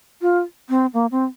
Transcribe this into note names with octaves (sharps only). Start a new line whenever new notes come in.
F4
C4
A#3
C4